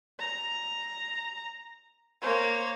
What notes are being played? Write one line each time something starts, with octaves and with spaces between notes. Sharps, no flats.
A#5
A#3 C5 C#5